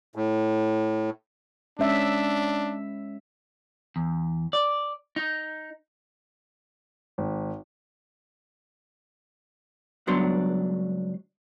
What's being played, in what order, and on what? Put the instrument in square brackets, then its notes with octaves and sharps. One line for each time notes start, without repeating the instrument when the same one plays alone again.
[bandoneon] A2
[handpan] G#3 C#4 E5 [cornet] D4
[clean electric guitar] E2
D5
D#4
[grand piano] G#1
[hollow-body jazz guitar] C#2 G2 F#3 B3 D4 C6